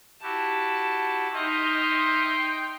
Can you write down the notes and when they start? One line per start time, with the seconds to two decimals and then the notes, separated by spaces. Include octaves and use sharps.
0.22 E4 F#4 G4 A5
1.34 D#4 D#5 E5 G5 C6 D#6 F6